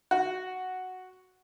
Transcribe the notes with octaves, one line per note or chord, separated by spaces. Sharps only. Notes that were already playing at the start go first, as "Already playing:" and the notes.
F#4